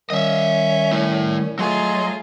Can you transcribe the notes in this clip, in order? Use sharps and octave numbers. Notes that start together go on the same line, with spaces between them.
D#3 G3 C#4 D#5 E5
A3 E4
F#3 A3 F4 G#4 D#5 C6